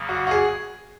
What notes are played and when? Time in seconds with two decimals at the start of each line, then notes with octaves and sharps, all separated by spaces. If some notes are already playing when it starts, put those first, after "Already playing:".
Already playing: E2 C#3 F#3 A#3
0.09 F#4
0.27 F#4
0.31 G#4